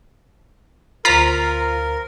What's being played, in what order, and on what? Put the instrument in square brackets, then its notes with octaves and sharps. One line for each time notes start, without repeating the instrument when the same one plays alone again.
[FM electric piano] D2 C5 F5 [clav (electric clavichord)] F4 [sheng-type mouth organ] A#4 [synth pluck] A#5 B6